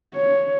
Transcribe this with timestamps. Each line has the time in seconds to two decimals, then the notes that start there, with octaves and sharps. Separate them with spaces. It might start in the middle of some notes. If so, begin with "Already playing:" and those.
0.14 C#5